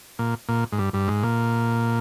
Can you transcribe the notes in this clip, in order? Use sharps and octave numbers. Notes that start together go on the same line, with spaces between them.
A#2
A#2
G#2
G2
G2
G#2
A#2